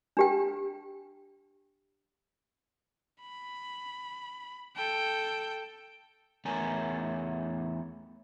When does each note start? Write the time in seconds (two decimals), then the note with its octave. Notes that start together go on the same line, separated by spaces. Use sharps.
0.17 D4 G4 G5
3.22 B5
4.77 A4 G5
6.45 E2 A3 C#4 A#4 G#5